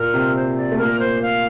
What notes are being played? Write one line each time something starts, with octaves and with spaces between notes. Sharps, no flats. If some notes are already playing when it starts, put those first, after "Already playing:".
Already playing: A#2 A#3 A#4
C3 C4
C5
D5
A3
A#2 A#3 A#4
C5
F5